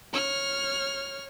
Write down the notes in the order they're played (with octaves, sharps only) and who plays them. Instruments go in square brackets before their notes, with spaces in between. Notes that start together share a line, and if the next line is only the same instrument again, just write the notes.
[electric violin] C#5 F6